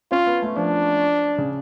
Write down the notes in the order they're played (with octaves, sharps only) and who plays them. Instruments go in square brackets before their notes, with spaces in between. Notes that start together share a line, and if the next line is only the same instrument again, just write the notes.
[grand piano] C#4 [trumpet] F4
[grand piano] B3
A3
[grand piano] F3 [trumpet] D4
[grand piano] C#3